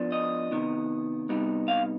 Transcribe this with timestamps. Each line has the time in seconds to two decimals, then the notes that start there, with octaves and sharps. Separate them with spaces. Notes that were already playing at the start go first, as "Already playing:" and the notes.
Already playing: F3 B3 D4
0.12 D#5
0.51 C3 D#3 B3
1.29 C3 G3 B3 D#4
1.68 F5